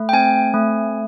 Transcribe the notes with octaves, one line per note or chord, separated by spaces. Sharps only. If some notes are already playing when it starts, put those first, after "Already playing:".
Already playing: A3
G5
C4 G#5
A3